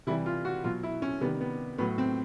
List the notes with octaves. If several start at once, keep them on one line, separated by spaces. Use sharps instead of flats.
C3 E3 G3 E4
F4
F#4
B2 F#3 F4
E4
C#4
C3 D#3 G3 B3
B3
A2 F#3 B3
C4